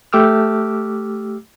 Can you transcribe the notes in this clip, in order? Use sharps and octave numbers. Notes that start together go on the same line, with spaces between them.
A3 G4 D6 E6 F6